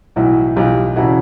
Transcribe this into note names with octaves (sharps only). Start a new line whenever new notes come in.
B1 A2 E3 E4 F#4
B1 A2 E3 F4 G4
E1 C#3 E3 E4 F#4